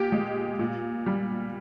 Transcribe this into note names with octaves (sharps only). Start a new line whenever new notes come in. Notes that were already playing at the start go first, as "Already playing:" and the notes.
Already playing: A#2 G4
G#3
A#2
G3